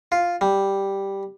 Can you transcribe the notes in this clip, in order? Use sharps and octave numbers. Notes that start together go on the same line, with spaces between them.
F4
G3